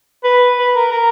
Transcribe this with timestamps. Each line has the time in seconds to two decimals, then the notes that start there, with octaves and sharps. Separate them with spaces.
0.24 B4
0.58 B4
0.76 A#4
0.92 A#4